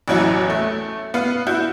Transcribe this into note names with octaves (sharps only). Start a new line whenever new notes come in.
A1 E2 F#3 E4 F#4
A3
B3 F5
E4 F#4 G6